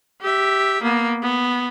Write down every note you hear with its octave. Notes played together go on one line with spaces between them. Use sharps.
G4 E5
A#3 B3
B3